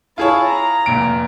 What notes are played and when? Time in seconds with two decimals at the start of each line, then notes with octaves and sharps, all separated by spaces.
0.18 E4 F4 G#4 C#5 A5
0.47 A#5
0.86 F1 A#2 D7